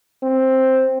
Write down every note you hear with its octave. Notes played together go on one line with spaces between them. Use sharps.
C4